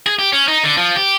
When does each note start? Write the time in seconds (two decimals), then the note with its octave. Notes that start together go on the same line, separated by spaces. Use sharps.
0.06 G#4
0.19 G4
0.33 C#4
0.48 D#4
0.64 D3
0.77 F3
0.95 G4